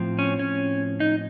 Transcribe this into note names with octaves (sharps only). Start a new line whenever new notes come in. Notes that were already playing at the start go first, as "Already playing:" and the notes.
Already playing: A2 F3 C4
C#4
C#4
D#4